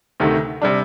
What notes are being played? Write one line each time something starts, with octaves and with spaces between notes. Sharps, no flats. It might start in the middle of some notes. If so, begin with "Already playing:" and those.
D2 C3 D#3 A3
C3 G3 D4